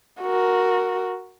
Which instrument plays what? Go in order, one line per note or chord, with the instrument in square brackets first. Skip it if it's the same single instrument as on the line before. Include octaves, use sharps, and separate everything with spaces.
[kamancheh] F#4 A#4